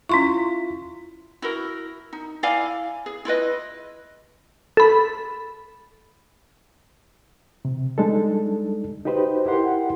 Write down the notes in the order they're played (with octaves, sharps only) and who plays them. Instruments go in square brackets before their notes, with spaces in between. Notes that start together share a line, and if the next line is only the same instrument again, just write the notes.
[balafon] C#4 C6 C#6 [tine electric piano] E4 F4
[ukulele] E4 F#4 A#4
D#4
E4 D5 F5 G#5
G#4
E4 F4 B4 D#5
[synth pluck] A4 B5
[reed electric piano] C3
G3 G#3 D4 D#4 A4
D#4 F#4 G4 B4 C5 D#5
E4 G4 A#4 F#5 C6